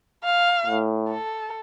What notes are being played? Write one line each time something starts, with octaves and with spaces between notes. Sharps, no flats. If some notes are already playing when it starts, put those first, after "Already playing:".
F5
A2
A4